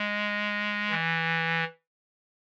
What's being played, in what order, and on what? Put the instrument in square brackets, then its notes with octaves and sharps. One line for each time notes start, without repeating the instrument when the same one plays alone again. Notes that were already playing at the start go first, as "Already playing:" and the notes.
Already playing: [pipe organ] G#3
E3